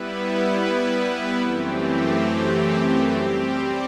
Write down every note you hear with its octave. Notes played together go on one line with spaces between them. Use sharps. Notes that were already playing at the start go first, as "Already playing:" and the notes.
Already playing: G3 B3 E4 B4
F#2 E3 A3 C4 G4
G3 C4 G4